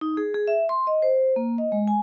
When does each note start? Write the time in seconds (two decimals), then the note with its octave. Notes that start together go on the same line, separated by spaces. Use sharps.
0.01 D#4
0.17 G#4
0.34 G#4
0.48 E5
0.69 C6
0.87 D#5
1.02 C5
1.36 A#3
1.58 D#5
1.72 G#3
1.87 G#5